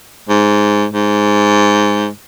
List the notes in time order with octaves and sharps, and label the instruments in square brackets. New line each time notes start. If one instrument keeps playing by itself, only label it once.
[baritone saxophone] G#2
G#2